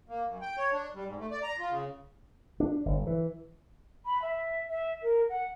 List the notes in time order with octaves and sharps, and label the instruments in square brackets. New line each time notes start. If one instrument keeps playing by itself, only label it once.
[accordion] A#3
F#2
G5
C#5
D4
G3
G#2
A3
D5
A#5
F4
C#3
[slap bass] D4
G1
E3
[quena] B5
E5
E5
A#4
F#5